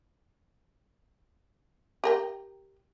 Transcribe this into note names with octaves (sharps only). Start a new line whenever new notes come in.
G4 A#4 G5